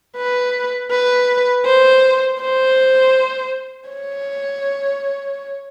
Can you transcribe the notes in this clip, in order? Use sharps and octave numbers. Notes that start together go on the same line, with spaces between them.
B4
B4
C5
C5
C#5